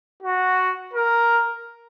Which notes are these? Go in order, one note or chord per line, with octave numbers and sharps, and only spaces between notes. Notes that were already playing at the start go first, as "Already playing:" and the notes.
F#4
A#4